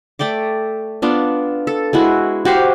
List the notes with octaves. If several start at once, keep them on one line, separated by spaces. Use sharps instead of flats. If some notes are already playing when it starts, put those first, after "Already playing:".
A3 D5 G5 D6
B3 D4 F4
A4
G#3 E4 F#4
F#4 G4 C5 F5